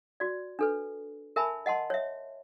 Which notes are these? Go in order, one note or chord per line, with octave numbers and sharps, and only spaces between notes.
F#4 D5
D4 A4 B4
A#4 E5 G#5 A5 B5
D#5 F#5 A5 C6
C#5 E5